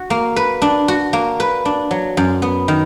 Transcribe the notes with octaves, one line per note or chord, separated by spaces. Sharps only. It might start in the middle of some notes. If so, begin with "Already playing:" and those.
Already playing: F#4
A#3
B4
D4
F#4
A#3
B4
D4
F#3
F#2
B3
D#3